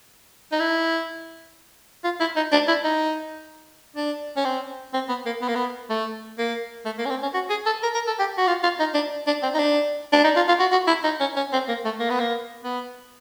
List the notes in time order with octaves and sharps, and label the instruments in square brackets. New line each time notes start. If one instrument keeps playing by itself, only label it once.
[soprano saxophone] D#4
E4
F4
E4
D#4
D4
E4
D#4
D4
C#4
C4
C4
B3
A#3
B3
A#3
B3
A3
A#3
A3
A#3
C#4
C4
C#4
F#4
G#4
A4
A#4
A#4
A4
G4
F#4
F4
F4
D#4
D4
D4
C4
D#4
D4
D4
D#4
F4
F4
F#4
F#4
E4
D#4
C#4
C#4
C4
A#3
A3
A#3
B3
A#3
B3